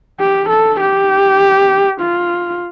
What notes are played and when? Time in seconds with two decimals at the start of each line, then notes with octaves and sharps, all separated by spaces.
0.20 G4
0.50 A4
0.81 G4
2.01 F4